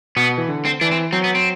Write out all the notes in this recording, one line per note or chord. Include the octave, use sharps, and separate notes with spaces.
B2 B3
E3
D3
C4
E3 D4
C4
F#3 C4
B3
C4